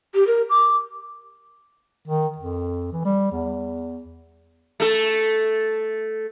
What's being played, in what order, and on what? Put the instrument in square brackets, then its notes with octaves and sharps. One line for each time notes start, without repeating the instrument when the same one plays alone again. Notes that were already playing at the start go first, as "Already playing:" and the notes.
[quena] G4
A#4
D6
[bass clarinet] D#3
F2
E3
G3
E2
[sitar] A3 A4